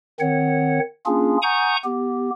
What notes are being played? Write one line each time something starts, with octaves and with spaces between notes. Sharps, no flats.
D#3 C4 C#5 F#5
A#3 C#4 D4 F4 G#4
F#5 G#5 A#5 C#6 D#6 G6
B3 G4